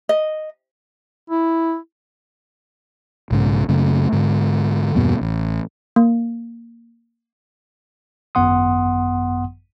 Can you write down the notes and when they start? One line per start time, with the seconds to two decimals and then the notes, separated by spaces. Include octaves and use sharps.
0.09 D#5
1.30 E4
3.31 B1 G#2 C#3
3.69 F#2 C#3 A3
4.13 G#2 D3
4.95 E2 G2 B2 A#3
5.21 A1
5.96 A#3
8.35 G#1 F#2 B3 F#5 C6 D#6